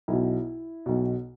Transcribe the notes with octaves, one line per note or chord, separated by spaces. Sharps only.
B1 B2 E4
B1 B2